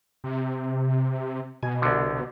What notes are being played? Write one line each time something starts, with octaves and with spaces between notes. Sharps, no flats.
C3
B2 G#5
C2 D3